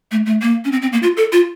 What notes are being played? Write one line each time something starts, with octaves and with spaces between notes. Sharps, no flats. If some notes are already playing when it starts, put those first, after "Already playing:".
A3
A3
A#3
C#4
C4
C4
A#3
F4
A4
F4